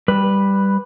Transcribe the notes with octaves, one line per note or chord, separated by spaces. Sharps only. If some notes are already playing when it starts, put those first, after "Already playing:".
G3 B4